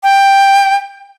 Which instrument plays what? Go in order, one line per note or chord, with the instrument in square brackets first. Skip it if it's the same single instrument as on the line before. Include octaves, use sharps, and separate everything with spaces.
[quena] G5